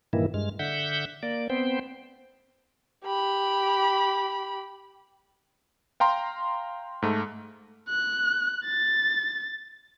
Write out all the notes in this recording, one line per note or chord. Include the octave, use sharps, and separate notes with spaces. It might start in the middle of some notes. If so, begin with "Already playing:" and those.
G2 A#2 D#3 E3 A#3 E4
G2 G#3 F6
D3 E5 F#5 G6
A#3 D5
B3 C4 C5 G5
G4 B5
F5 G5 A#5 C6
G#2 A3
F#6
A6